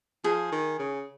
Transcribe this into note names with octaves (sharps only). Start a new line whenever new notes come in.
F3 G#4
D#3
C#3